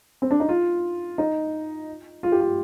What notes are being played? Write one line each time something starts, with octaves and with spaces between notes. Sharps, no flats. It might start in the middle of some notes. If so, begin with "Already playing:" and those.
C4
D4
D#4
F4
D#4
F4
G4
F4